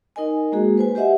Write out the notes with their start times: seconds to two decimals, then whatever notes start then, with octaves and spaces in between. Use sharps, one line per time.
0.16 D#4 A#4 D#5 G#5
0.52 G#3 A#3 F#4 G#4
0.78 B4 C5 G#5
0.95 G4 C5 D#5 E5 F#5